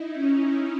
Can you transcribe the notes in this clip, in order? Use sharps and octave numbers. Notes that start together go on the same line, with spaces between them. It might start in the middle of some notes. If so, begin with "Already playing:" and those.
Already playing: D#4 E4
C#4